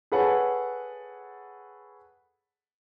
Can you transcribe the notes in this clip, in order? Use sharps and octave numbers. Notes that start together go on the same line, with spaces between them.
G#4 A4 B4 C#5 F#5 A5